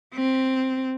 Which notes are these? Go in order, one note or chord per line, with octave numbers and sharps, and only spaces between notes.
C4